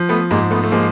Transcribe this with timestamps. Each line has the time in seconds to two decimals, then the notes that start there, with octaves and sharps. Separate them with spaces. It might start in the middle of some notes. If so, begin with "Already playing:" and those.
Already playing: F3
0.09 A3 B3
0.31 G#2 G#3 A#3
0.51 A3 B3
0.63 A3
0.72 F3 G#3 A#3